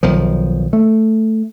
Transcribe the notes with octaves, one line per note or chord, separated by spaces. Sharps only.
B1 D#3 F3
A3